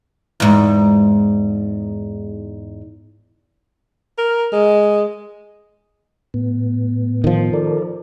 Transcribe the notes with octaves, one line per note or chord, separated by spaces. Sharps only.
E2 G#2
A#4
G#3
A2 B3
D#3 F3
A4 A#4 D5